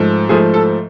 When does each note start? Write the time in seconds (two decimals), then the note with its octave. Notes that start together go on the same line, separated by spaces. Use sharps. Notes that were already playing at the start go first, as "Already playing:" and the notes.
Already playing: G#2 F3 A3
0.29 G#2 F3 A3 G#4
0.54 A4